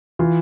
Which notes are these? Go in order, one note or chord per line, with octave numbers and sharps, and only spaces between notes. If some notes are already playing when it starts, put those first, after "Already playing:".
E3 F4